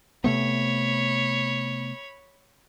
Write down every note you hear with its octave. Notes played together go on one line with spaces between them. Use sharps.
C3 A3 B3 C#5 B5